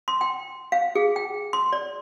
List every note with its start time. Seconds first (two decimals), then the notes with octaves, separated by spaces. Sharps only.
0.08 C6
0.21 G5
0.72 F5
0.95 G#4
1.16 G5
1.53 C6
1.73 D5